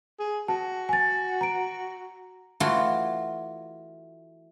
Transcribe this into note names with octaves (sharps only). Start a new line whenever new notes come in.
G#4
F#4 A5
G#5 A6
A#5 D7
E3 A3 F4 F#4 C6